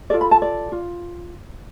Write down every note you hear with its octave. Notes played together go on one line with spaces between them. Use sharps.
F4 A4 D5
B5
A5
D5
F4